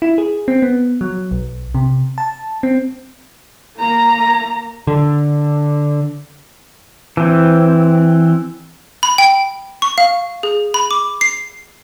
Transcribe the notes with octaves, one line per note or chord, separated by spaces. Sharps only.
E4
G#4
C4
B3
F#3
B1
C3
A5
C4
A#3 A#5
D3
E3 C4
B5
G5
C#6
F5
G#4
B5
D6
C7